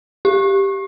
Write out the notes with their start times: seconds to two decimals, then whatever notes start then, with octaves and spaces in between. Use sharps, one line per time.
0.25 G4